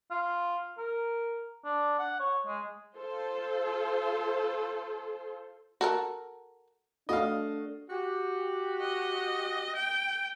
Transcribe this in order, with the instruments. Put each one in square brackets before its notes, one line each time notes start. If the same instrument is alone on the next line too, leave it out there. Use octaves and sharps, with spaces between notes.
[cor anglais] F4
A#4
D4
F#5
C#5
G#3
[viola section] F4 A4 C5
[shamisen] F#4 A4 A#4
[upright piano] A3 F#4 [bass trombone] D4 [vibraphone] A4 [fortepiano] D#5 F5
[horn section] F#4 G4
[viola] D#5
G5